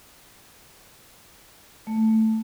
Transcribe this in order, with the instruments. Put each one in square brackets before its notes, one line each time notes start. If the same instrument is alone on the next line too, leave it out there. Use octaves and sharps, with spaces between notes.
[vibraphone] A3